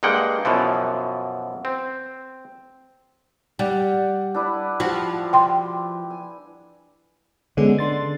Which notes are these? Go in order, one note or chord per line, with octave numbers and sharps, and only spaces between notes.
G2 G#3 A#3 F#5 G5
F#2 B2 E3 F3
C4
G3 F#5 G5
D4 E4 B4
F3 F#4 G4
G5 C6
G#5
D3 G#3 B3 C#4
D4 C6 A6